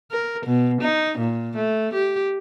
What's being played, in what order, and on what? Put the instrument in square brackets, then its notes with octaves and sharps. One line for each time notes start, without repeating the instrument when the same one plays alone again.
[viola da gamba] A#4
B2
D#4
A#2
A3
G4